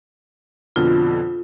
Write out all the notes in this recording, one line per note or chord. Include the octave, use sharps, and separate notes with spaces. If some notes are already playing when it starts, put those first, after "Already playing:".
F2 B2 D3 F4